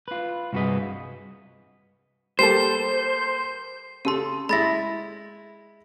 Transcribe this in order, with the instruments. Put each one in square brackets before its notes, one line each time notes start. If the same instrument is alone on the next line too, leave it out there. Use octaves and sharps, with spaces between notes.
[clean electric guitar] F4 B4
C2 G2 F#4 G#4 B4 D#5
[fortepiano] G3 A#3 A4 [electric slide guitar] C5 [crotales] C7
[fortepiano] C#3 A4 [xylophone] G4 C6
[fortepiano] G#3 E4 [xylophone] B5 A6 A#6